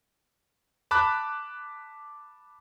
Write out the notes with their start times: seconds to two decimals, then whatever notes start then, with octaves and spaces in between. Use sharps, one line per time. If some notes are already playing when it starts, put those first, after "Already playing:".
0.91 A5 B5 D6 F#6